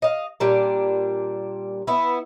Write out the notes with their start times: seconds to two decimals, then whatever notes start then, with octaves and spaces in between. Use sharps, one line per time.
0.02 D#5 F5
0.40 A#2 G3 D4
1.87 B3 E4